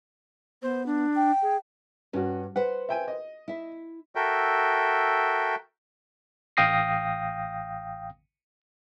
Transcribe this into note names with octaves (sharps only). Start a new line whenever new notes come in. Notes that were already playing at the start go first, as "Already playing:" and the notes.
B3 C5
D4
G5
G#4
G2 C#4 F#4
B4 C5 F#5
E5 G5 G#5
D#5
E4 E5
F#4 A4 A#4 E5 G5
A1 F5 G5 D#6 A#6 C7